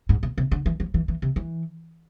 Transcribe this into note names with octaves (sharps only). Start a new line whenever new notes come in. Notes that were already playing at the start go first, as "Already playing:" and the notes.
G#2
B2
C3
D3
E3
F3
E3
E3
C3
E3